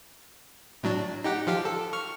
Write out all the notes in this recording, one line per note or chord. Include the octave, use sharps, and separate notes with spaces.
A2 F#3 D4
D#4 G4 F#5
F3 G4 F5
A4
C#6 F6